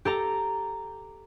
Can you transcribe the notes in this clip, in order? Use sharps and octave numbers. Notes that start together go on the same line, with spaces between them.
G4 A4 A#5